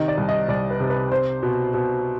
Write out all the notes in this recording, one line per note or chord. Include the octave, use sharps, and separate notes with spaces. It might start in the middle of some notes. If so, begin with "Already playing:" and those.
Already playing: C3 D#3 D#5
D5
C2
D#5
C2 D5
B4
C3
B4
C4 C5
B2
B2